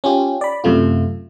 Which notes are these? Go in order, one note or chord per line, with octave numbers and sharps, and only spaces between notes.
C#4 F4 G4
D5 B5
F#2 C3 A3 F4